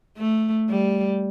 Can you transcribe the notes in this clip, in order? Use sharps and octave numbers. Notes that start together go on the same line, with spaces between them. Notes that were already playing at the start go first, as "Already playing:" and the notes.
A3
G3